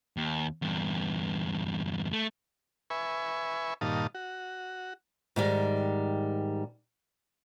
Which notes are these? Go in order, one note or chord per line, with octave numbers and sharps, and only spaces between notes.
D#2
E2 G2
A3
B4 E5 G#5 C#6
G2 A#2 D#3 F5 A5 D#6
F#4
G#2 D#3 G3